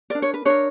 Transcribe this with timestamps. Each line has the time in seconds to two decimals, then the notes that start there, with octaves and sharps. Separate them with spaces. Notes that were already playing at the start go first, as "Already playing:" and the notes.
0.10 D4 A#4 D5
0.22 C#5
0.34 B4
0.45 D4 A#4 C#5